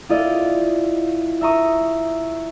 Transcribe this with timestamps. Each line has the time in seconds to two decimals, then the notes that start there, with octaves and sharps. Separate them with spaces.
0.09 E4 F4 D5 D#5
1.41 E5 A#5 C#6 D#6